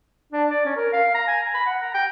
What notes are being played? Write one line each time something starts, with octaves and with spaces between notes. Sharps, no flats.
D4
D5
C#4
A#4
F5
A#5
G#5
A#5
B5
F#5
A#5
G5